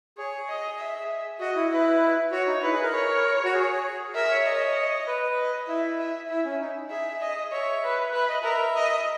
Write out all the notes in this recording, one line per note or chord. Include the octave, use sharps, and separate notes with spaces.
G#4 C#5
D#5
E5
F#4 D#5
E4
E4 B4
F#4 C#5
D#4
E4 B4
G#4
A#4
C#5
F#4
G#4
A#4 E5
C#5
D#5
B4
D#5
E4 E5
E5
E4 E5
C#4
D#4
G#4 E5
D#5
C#5 E5
B4
B4 E5
D#5
A#4 E5
D#5